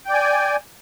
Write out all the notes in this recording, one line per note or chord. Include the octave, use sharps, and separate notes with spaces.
D5 G5 G#5